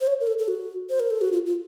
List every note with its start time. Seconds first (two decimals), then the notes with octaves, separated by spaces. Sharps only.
0.01 C5
0.07 C#5
0.20 A#4
0.27 A4
0.39 A4
0.48 F#4
0.90 C5
1.00 A#4
1.11 A4
1.21 F#4
1.32 F4
1.46 F4